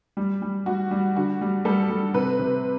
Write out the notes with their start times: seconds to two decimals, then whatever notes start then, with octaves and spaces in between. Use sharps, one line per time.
0.17 G3
0.42 G3
0.66 G3 F#4
0.91 G3
1.16 D3 F#4
1.41 G3
1.65 G3 A4
1.90 G3
2.14 C3 B4
2.39 C3